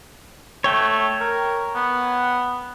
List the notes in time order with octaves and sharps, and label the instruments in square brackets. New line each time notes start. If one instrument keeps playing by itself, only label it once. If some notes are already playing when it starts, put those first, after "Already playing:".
[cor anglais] A3 [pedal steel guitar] C#5 G5
[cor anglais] A#4
B3